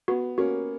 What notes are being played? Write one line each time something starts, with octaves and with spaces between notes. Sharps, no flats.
B3 F#4
A#3 C#4 F#4